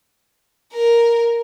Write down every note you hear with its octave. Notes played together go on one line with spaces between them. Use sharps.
A#4